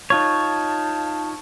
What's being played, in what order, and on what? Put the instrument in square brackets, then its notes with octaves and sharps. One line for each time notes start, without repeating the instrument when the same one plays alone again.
[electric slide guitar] D#4 F4 C#5 [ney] A5